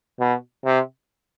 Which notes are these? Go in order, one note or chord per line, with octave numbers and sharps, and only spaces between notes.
B2
C3